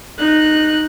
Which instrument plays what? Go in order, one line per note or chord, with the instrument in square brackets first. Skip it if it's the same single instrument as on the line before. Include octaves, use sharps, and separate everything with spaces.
[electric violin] D#4 F#6